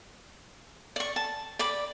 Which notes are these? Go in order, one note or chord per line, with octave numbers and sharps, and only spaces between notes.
D5 C#6
A5
D5 B5 D6